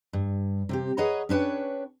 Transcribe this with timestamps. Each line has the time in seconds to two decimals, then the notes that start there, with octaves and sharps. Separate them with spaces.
0.13 G2
0.69 C3 C4 G4
0.97 G#4 B4 C#5 D#5 F#5 A#5
1.29 C#4 D4 B4 C#5 G5